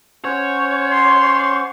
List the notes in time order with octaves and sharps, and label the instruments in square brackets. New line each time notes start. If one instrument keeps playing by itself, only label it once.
[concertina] C#4 C5 F#5 [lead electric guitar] C#5
[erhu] C6